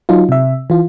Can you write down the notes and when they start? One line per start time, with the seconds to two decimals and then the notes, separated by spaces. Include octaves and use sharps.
0.09 F#3 D#4 F4
0.29 C3 E5
0.70 E3 F4